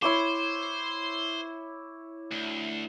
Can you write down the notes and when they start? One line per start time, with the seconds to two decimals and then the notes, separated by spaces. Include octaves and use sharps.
0.02 E4 C5 C#5 D6
2.32 D2